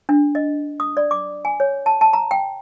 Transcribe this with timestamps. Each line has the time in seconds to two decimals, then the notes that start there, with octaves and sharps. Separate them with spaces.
0.09 D4
0.35 D#5
0.80 D#6
0.97 D5
1.11 D6
1.45 G#5
1.60 C#5
1.86 A5
2.01 A5
2.13 A#5
2.31 G5